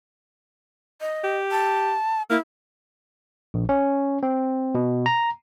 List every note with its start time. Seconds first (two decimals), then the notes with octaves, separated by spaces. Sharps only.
1.01 D#5
1.24 G4
1.51 A5
2.30 A#3 E4
3.54 A#1
3.69 C#4
4.23 C4
4.75 B2
5.06 A#5